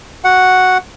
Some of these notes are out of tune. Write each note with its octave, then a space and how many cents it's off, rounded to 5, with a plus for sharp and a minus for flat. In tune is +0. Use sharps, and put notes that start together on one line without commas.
F#4 +0 F#5 +0